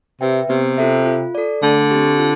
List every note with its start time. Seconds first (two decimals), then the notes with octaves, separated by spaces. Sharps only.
0.21 C3 B4 E5 G5
0.49 C3 B3
0.78 F4 A4 E5
1.06 F4
1.35 A4 D5
1.63 D3 A3
1.91 C4 G4
2.19 F4